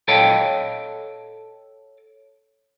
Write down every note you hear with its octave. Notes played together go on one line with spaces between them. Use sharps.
A4 C#5 D#5 F5 G5 A5